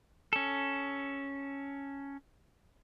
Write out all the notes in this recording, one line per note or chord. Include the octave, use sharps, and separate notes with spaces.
C#4 A4